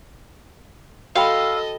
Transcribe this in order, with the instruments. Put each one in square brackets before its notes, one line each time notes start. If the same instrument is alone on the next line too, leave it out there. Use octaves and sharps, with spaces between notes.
[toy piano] F#4 G5 B5 [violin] A4 D#5 [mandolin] F5 [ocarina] E6